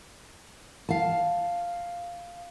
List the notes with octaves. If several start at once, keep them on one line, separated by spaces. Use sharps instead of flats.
F5 A5